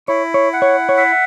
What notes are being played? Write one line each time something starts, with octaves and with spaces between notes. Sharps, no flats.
E4 C#5
C#5
F#5
C#5
C#5
E5